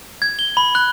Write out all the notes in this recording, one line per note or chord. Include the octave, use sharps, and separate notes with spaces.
G#6
G7
B5
F#6